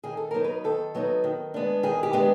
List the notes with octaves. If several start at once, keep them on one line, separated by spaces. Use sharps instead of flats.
D#3 G#4
A4
F#3 B3 D#4 A#4
B4
D#3 A4
F#3 B3 D#4
D#3
G#3 B3 D4
D#3 G#4
G4
G#3 B3 D4